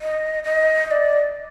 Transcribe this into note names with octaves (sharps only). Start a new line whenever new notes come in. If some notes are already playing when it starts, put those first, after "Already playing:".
D#5
D#5
D#5
D5